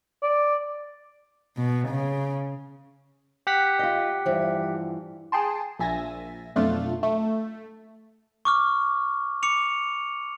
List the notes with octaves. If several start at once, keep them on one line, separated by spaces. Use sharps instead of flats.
D5
B2
C#3
G4 F#5 B6
F4 D#5
G2 E3 F3
G#4 G5 A5 C6
A#1 A#2 E5 G#5 A6 A#6
B1 F2 A3 D4 F4 A6
A3
C#6 D6 F6
D6 C#7 F7